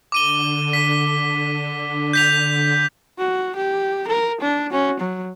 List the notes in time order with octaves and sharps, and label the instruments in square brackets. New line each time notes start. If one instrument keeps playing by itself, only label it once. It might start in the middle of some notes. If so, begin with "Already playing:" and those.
[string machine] D3 [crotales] D6 D#7 G7
[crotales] B6
G6 B6 F7
[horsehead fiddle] F#4
G4
A#4
D4
C#4 F#4
F#3